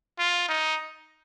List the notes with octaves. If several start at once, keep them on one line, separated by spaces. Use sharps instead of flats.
F4
D#4